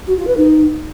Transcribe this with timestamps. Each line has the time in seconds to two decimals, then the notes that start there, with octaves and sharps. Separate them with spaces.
0.07 F#4
0.17 F4
0.27 B4
0.37 D#4